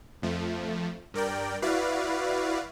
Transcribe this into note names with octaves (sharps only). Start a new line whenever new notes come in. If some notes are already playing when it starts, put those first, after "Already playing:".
F2 F3 A3
G2 A#4 D5 G5
E4 F#4 B4 D5 F5